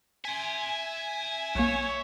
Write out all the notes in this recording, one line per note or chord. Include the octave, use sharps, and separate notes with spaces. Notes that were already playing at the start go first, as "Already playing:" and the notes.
E5 G#5 C6
B1 A#3 C#5